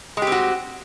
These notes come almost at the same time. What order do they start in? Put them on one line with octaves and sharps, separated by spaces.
G#3 G4 C4 F#4